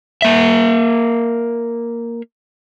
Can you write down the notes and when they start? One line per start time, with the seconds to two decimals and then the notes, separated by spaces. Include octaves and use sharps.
0.22 A#3 E5